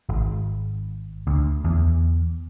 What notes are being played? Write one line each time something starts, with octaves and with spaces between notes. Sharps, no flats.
G#1
D2
E2